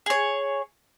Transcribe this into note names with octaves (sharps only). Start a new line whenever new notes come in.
G#4 C#5